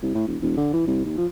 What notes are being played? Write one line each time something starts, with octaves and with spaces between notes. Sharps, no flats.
C2
A2
E1
E1
D3
E3
C2
D#2
F3